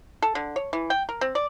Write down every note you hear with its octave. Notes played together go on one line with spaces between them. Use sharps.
A4
D3
C#5
E3
G5
A#4
C4
D5